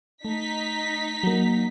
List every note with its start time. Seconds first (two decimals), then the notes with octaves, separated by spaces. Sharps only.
0.25 A3 D#4 B6
1.23 F#3 A#3